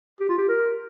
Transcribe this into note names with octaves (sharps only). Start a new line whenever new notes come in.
G4
F4
G4
A#4